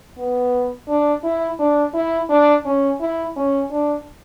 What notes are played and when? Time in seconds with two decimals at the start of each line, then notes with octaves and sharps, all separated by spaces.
0.17 B3
0.88 D4
1.23 E4
1.59 D4
1.94 E4
2.30 D4
2.65 C#4
3.00 E4
3.36 C#4
3.71 D4